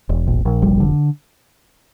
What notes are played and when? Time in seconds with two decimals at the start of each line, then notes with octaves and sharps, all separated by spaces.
0.09 E1
0.28 A#1
0.45 A#1
0.62 F1 G3
0.80 D3